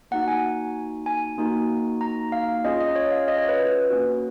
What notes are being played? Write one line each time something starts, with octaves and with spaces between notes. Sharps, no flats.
A#3 D#4 F#4 F#5
G#5
G#5
A#3 D#4 F#4
A#5
F5
C#4 F4 G#4 D#5
D#5
C#5
F5
D#5
C#5
B4
B4
A#3 C#4 F#4